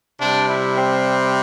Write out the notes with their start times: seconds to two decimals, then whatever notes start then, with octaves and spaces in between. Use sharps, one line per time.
0.20 C3 G3 D4
0.49 E4
0.77 C4